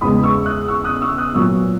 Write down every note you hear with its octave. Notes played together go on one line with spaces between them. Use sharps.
E2 C#3 G#3 B3 B5 D#6
C#6 E6
D#6 F#6
C#6 E6
D#6 F#6
C#6 E6
D#6 F#6
A#2 F#3 B3 C#6 E6